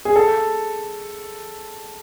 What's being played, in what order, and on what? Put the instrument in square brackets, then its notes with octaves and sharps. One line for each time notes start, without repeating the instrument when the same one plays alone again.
[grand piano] G#4
A4